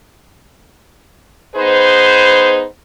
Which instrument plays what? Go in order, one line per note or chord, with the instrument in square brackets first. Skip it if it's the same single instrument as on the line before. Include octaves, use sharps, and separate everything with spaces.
[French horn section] B3 D#4 G#4 B4 C5